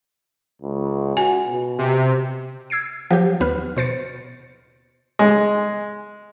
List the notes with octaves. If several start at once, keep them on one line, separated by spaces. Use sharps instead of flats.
C#2
F#4 G#5
B2
C3
E6 G#6 C7 D7
F3 F#3 G4
D#2 B3 B4 F6
B2 C5 A6 C#7
G#3